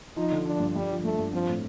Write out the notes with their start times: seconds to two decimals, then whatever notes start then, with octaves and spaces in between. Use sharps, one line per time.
0.16 F3 D#4
0.32 D3
0.45 F3 D4
0.60 G2
0.75 G2 G3
0.90 F3
1.05 G2 A3
1.19 G2
1.33 F3 C4
1.49 A2